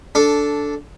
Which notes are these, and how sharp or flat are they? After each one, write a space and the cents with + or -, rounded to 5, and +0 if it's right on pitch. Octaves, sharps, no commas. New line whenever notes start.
D4 -10 A4 +0